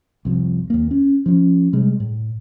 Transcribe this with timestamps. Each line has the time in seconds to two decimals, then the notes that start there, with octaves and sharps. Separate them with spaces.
0.25 C2 F2
0.70 D#2 A#3
0.91 C#4
1.26 F3 C#4
1.73 C3 G3 G#3
2.00 A2